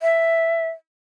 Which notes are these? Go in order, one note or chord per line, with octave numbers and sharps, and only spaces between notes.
E5